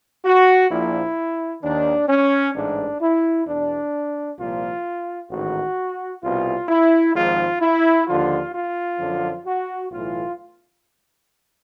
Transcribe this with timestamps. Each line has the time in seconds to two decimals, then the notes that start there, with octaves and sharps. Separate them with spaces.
0.24 F#4
0.70 A#1 A#2 F3 E4
1.62 D#2 D#3 D4
2.08 C#4
2.55 A1 G#2 E3 D4
3.01 E4
3.47 E2 B2 D4
4.38 C2 A#2 F3 F4
5.30 A1 G#2 D#3 F#4
6.23 C2 B2 F4
6.69 E4
7.15 G#1 G#2 F3 F4
7.61 E4
8.07 D#2 D3 F3 F4
8.53 F4
8.99 F#2 D3 F3
9.45 F#4
9.91 B1 A2 E3 F4